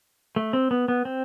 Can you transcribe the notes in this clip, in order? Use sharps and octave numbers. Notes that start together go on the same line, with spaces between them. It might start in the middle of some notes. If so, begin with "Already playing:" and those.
A3
C4
B3
B3
C4